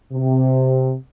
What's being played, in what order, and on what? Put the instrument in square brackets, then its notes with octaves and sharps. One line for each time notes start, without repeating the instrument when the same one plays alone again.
[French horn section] C3